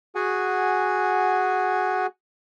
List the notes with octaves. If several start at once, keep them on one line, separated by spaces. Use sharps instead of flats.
F#4 G#4 F#5 G#5